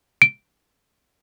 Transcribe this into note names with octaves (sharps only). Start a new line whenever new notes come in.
D7